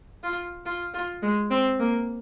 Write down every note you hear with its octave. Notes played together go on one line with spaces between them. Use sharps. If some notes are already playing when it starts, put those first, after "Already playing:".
F4
F4
F4
G#3
C4
A#3